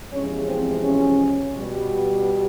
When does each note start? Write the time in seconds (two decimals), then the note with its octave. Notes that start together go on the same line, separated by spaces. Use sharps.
0.12 E2 C3 F3 G#3 C#4
0.47 C4
0.82 C#4
1.53 B2 G3